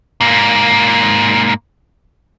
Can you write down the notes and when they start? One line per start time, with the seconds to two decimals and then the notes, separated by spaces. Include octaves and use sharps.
0.21 G#2 A#3